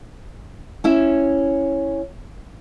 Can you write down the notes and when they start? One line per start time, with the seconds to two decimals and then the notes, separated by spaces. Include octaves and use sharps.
0.84 C#4 E4 E5